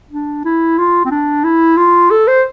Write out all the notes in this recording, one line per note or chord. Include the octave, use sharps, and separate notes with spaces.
D4
E4
F4
C4
D4
E4
F4
A4
C5